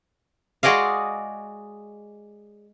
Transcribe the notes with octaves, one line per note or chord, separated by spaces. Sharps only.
G#3 F#4 G#4 D5 D#5 F5